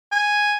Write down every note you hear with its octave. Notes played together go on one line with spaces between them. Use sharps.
G#5